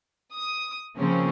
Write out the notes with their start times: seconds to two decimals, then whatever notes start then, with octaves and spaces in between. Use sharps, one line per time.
0.35 D#6
0.97 C#3 F3 A#3 C4 C#4